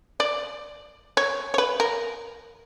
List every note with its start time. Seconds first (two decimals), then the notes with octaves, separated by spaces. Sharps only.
0.20 D5
1.17 C#5
1.54 C#5
1.58 B4
1.80 A#4